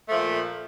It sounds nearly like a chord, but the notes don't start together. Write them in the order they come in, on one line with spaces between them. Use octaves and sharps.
A3 F3 A#2